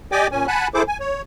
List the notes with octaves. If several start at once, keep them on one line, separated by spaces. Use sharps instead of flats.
G4 D5 D#5 G5 G#5 D6
A#2 C#4 G#5
F#5 G#5 A5 B5 F#6
E4 G#4 A4 C5 D6
G#5
C#5